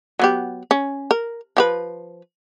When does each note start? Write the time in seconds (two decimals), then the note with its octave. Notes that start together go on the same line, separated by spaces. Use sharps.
0.19 F#3 B3 G4
0.71 C#4
1.11 A#4
1.57 F3 G4 B4